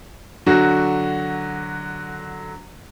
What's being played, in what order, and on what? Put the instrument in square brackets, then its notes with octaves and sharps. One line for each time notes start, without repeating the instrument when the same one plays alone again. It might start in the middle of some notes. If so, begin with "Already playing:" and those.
[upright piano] D3 F#3 F#4